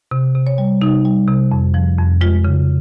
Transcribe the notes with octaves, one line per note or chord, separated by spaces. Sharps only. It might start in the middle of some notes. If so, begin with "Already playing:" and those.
C3
C3
C#5
G3
C3 D#4
G3
C3
F2
F3
F2
G#3 F4
C#3